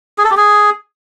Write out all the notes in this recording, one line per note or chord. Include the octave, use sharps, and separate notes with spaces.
G#4
A4
G4
G#4